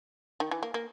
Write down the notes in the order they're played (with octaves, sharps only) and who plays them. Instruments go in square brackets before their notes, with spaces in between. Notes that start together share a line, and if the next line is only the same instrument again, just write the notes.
[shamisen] D#3
E3
A#3
A#3